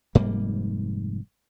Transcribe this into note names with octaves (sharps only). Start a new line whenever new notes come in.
F1 G#2 G3 A#3